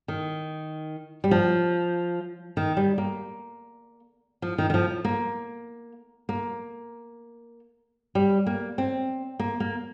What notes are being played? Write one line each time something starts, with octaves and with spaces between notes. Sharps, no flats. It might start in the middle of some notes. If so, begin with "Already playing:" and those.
D#3
G3
F3
D#3
G3
A#3
F3
D#3
D#3
F3
A#3
A#3
G3
A#3
C4
A#3
A#3